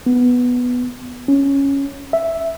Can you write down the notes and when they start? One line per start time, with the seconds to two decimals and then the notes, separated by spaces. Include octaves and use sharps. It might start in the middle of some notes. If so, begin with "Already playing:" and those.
0.06 B3
1.28 C#4
2.13 E5